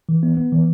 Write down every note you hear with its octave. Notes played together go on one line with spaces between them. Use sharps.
E3
B3
B3
E3